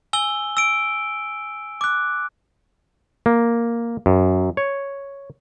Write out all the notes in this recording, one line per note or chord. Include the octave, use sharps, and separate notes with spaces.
G#5 E6 G7
E6 D7
D6 F#6
A#3
F#2
C#5